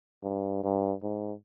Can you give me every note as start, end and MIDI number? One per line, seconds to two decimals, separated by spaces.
0.23 0.63 43
0.63 0.93 43
1.03 1.32 44